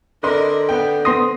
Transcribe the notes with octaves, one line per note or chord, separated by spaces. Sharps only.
D3 A#4 B4 D5 D#5 C6
B3 G5
B3 C4 C6 D#6 A#6